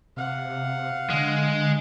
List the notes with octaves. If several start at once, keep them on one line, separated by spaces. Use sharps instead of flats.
C3 F5 F#5
D3 G#3